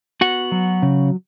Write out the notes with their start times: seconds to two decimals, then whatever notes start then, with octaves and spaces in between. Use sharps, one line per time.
0.21 B3 F#4 F#5
0.52 F#3
0.82 C#3